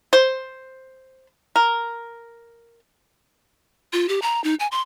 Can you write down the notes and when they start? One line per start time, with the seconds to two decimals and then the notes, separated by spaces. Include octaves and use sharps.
0.13 C5
1.56 A#4
3.93 F4
4.09 G4
4.22 A#5
4.44 D#4
4.60 G#5
4.72 C6